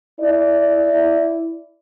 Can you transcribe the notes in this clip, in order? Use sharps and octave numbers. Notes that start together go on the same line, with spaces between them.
E4 D5